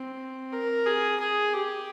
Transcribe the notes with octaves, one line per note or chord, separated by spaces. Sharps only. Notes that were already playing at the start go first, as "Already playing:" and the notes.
Already playing: C4
A#4
G#4
G#4
G4